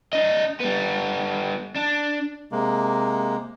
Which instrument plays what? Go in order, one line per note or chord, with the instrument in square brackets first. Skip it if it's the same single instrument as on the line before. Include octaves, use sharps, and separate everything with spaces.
[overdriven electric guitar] D4 D#5
G3 B3
D4
[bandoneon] C3 G#3 A#3